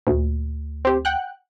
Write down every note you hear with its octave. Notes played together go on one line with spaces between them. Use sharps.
D2 A#2
C4 G4 C5
F#5 G5 F#6